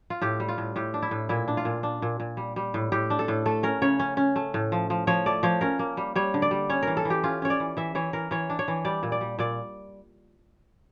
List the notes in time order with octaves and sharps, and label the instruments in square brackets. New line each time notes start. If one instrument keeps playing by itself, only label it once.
[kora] F4
A2 G4
G3
F4
A2
A2 G4
D4
E4
A2
A#2 E4
D4
F4
A#2
D4
A#2
A#2
G3
G3
A2
A2 G4
D4
A4
A2
A3 A4
C#4 A#4
C#3 C#5
C#4
C#4
A3
A2
F3
F3
F3 C#5
A3 D5
F3 C#5
C#4 A#4
A#3
G3
G3 C#5
D3
D5
G3
C#4 C#5
E3 A#4
A4
E3 G4
C#4 F4
C#4 C#5
D5
E3
E3 E5
E3 C#5
E3 A#4
E3 C#5
D4
C#5
E3
G3 D5
A#2
D5
G3
A#2 D5